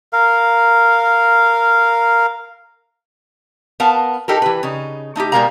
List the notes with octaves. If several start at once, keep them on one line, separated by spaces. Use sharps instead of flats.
A#4 F5
B3 A#4 F5 A5
D#4 G4 A4 A#4
E3 B4
C#3 D#4
A3 D#4 E4 G4
B2 G3 G#3 A#4 F5 A#5